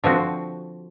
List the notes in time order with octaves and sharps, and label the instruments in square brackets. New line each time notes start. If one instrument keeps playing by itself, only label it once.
[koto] D3 F3 C4 F#4